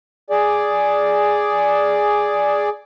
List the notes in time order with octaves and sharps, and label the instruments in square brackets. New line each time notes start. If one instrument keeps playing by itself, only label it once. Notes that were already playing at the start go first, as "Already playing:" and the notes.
[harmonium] G#4 D5